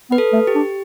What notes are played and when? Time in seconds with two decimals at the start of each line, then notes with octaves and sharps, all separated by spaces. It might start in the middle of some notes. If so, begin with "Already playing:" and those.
0.10 B3 B4
0.18 A4
0.33 A3
0.47 G4
0.55 D4